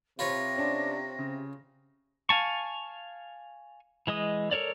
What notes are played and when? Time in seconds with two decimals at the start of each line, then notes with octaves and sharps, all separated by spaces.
0.19 C3 F4 B4 C#5 A#6
0.56 C#4 D4
1.19 C#3
2.29 F5 G#5 A5 C#6
4.07 E3 G#3 D#5 D#6
4.51 A4 A#4 C#5 D5